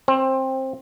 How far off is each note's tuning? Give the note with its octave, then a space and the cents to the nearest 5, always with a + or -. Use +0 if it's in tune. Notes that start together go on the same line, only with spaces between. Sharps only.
C4 +15 C5 +30